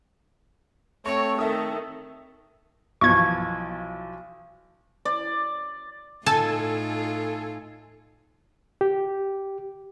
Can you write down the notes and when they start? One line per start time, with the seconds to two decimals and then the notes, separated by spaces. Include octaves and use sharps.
1.06 A3 C4 C#5 C#6
1.39 D#3 A4 E5 D#6
3.01 B1 E3 F3 C#6 G#6
5.05 D5
6.26 A2 D#4 F4 A4 G#5 A5
8.81 G4